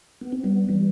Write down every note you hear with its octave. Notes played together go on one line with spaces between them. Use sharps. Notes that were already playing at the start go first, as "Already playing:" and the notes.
B3
C4
G3 B3
E3 G3